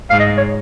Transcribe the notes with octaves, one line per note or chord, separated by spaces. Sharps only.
G#2 F5
D#5
C#5